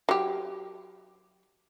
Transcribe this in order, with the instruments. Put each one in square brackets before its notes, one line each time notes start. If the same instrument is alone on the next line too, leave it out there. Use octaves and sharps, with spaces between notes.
[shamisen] F#3 G4